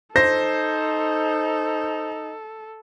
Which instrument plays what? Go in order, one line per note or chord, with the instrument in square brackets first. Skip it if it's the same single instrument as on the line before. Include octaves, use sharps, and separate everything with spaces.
[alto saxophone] D#4 [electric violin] A4 [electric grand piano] C5 [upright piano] A#6